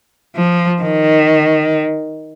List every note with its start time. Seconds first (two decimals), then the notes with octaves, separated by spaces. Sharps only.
0.36 F3
0.82 D#3